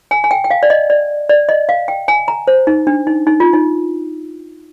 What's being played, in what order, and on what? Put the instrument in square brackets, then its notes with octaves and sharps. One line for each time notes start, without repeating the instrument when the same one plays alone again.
[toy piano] G#5
G#5
G5
G5
F5
D5
D#5
D5
D5
D#5
F5
G5
G#5
A#5
C5
D#4
D4
D#4
D#4
F4
D#4